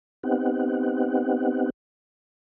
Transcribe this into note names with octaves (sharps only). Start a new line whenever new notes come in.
B3 C4 D#4 G4 F#5